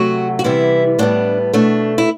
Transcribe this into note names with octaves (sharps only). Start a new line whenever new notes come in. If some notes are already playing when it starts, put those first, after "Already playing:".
Already playing: C3 F#3 A3 F#4
F#4
C3 E3 G3 B3 E4
A2 G3 B3 D4
B2 A3 D4
E4